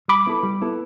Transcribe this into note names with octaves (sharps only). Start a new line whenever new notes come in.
G3 B5 D6
B3 E4 A4
G3
B3 E4 A4